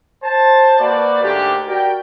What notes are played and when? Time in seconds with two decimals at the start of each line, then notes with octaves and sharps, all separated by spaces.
0.24 C5 A5
0.79 A#3 F#4 B4 C5 D5
1.23 G#2 D3 A3 A#3 D4 G4
1.67 F#4 G4 A#4 D5 G5